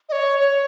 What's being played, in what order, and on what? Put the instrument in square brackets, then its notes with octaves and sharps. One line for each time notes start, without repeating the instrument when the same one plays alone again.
[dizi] D#5
C#5
C#5